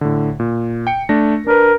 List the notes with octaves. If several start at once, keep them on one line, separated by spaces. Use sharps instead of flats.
A2 D3
A#2
G5 C#7
A3 D4 A#6
D4 A#4 B4